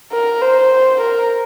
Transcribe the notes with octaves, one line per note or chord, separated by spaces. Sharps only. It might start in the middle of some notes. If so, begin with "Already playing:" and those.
A#4
C5
A#4